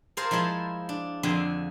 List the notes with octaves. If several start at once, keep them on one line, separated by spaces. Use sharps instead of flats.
G#4 A#4 C5 F5 A5
F3 G#3 E4 G#4 A5
D4
F2 D3 G#4 C6